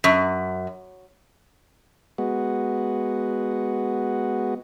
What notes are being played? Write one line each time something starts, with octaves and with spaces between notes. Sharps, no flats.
F#2
G#3 B3 F#4